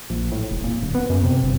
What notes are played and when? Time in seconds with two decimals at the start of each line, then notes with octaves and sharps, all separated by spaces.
0.10 A#1
0.32 A2
0.51 E1
0.64 A#2
0.83 D1
0.95 B3
1.10 F#2
1.24 C3
1.43 G1